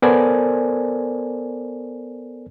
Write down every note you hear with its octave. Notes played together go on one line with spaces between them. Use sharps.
B3 A4 A#4 C5 D5 G#5